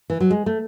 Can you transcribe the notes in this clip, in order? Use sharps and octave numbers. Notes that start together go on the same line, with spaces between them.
E3
F#3
G#3
A3